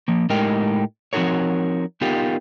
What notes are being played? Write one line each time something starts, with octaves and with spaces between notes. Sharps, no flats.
F3 A#3
A2 G#3 D#4 G4 A#4 G5
F3 C4 D#4 F#4 A#4 C#5
B3 D#4 F4 G4 A#4